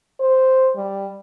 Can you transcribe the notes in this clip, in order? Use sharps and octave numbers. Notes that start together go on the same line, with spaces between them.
C5
G3